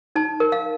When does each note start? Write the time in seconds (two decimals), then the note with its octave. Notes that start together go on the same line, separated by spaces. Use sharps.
0.15 D#4 A5
0.40 A#4
0.52 F5